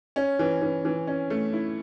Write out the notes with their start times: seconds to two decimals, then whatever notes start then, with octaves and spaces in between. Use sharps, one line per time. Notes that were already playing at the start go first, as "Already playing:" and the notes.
0.16 C#4
0.39 E3
0.62 E3
0.85 E3
1.07 C#4
1.30 A3
1.53 E4